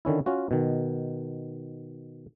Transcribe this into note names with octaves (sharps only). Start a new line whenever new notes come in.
D3 D#3 C#4 E4
C#4 F4 F#4
B2 D#3